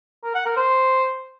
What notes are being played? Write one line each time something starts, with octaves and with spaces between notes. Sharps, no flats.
A#4
F#5
A#4
C5